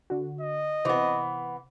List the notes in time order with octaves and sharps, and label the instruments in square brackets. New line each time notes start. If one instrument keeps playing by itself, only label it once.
[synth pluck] D3 F#4
[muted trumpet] D#5
[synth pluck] C3 C5 [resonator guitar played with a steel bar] E3 B3